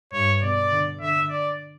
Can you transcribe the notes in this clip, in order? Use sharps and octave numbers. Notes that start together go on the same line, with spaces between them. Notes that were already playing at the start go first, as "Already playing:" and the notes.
G2 C#5
B2 D5
D3
D3 E5
D5